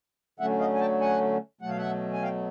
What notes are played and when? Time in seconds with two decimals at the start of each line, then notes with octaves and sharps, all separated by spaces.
0.40 D3 F#3 A3 C#4 E5 F#5
0.60 D#5 F5
0.74 G#5
0.80 G5 A5
1.00 F#5 G#5
1.61 B2 F#3 A3 F#5
1.69 F5
1.77 E5 F#5
2.13 G#5
2.22 F5 G5